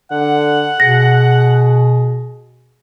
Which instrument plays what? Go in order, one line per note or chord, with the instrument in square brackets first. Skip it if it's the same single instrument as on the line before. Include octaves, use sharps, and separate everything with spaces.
[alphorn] D3 [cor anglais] F#5
[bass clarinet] B2 [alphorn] G#4 [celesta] A#6